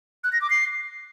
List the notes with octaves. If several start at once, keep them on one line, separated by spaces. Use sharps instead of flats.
F#6
A#6
D6
C7